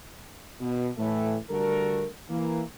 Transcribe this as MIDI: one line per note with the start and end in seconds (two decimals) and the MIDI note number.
0.60 0.90 47
0.98 1.37 45
0.98 1.37 52
0.98 1.37 57
1.50 2.07 50
1.50 2.07 55
1.50 2.07 57
1.50 2.07 66
1.50 2.07 69
1.50 2.07 70
2.30 2.62 52
2.30 2.62 58